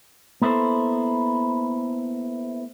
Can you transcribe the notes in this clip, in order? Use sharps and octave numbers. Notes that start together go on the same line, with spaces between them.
A#3 B3 E4 A4 C5